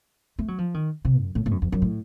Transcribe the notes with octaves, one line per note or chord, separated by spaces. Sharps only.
A3
F#3
F3
D#3
C3
F#2
A2
A2
F#2
F2
F#2
A2